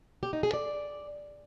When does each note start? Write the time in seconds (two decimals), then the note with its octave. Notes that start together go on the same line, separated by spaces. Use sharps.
0.23 G4
0.33 D#4
0.43 G#4
0.53 D5